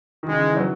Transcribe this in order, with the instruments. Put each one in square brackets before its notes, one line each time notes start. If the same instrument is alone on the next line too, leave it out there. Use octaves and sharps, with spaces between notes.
[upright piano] D#3
[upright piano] C#3 [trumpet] G#3
[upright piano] D#3
E3
F#3